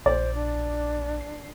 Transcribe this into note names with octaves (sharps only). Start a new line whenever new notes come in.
A#1 C5 D5
D4
C7